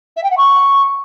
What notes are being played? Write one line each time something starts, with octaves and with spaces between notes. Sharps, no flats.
E5
G5
F#5
C#6